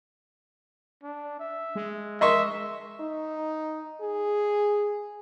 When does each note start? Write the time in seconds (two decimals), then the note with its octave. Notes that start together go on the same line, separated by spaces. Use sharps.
1.03 D4
1.40 E5
1.75 G#3
2.21 D#5 E5 C6 C#6
3.00 D#4
4.01 G#4